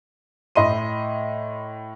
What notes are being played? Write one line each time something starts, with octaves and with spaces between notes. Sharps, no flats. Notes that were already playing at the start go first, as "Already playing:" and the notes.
A2 D#5 B5 C6 D#7